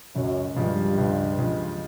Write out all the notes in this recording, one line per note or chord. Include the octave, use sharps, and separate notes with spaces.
C#2 F#2
G2 C#3 F3 G#3
C#2
C#3 F3 G#3